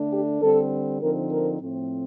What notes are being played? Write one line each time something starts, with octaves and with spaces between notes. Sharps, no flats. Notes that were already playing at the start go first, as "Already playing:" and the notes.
Already playing: D3 A3 D4
G4
D3 G3 C4 A4
D3 F3 C4 D#4 A#4
A#4
A2 F3 A3 C4